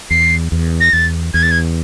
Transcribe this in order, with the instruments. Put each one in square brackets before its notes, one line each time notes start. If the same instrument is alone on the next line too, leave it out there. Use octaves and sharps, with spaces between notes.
[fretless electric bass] E2 [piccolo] C7
[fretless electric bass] E2
[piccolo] A#6
[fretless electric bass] E2 [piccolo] A6
[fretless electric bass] E2 [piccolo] G#6
[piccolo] A6
G#6